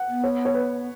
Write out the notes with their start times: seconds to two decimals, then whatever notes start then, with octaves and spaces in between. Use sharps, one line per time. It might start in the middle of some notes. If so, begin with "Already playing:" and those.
Already playing: F#5
0.08 B3
0.24 C#5
0.45 C#5
0.54 B4